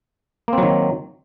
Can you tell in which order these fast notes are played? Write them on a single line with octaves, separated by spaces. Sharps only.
A#3 C4 F#3 D#3